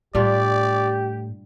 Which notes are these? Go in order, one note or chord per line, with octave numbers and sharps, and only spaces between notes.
A2 G3 D4 F4 G4 D5